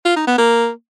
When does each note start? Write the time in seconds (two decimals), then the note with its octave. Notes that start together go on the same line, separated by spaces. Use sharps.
0.05 F4
0.16 D#4
0.27 B3
0.38 A#3